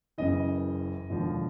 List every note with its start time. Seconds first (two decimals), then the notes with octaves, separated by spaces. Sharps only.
0.18 F#1 F#2 C#3 E3 D#5
1.10 E1 D#2 D3 F3